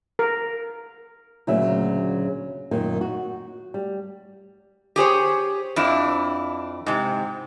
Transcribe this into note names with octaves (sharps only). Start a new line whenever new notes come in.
A#4
D2 A#2 C#3 F#3 E5
F#2 A#2 D#3
F#4
G3
G4 G#4 C5 C#5
F2 D4 E4
G#2 C3